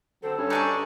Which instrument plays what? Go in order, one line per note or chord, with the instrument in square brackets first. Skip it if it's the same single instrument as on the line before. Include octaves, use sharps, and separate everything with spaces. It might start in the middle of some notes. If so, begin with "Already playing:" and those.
[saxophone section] D3 F#3 C4 [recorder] A4
[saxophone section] G2 C#4
[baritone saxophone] D4 [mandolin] D#4 G#5 C#6